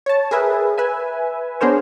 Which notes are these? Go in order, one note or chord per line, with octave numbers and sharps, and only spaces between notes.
C#5 A5
G#4 A#4 B4 E5
B4 E5 G#5
B3 D4 G#4 A#4 C5 C#5